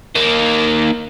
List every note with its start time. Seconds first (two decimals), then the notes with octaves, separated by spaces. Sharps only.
0.15 D#3 A#3